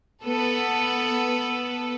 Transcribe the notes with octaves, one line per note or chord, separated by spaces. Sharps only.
B3 A4 B4